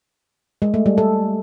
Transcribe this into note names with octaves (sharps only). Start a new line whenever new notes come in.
G#3
A3
G3
A4